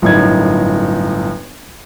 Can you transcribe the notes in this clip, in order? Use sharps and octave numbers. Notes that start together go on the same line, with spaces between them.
G1 F#2 A2 D#4 G#6